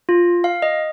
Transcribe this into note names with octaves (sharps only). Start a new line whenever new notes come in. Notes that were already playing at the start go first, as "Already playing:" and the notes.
F4
F5
D#5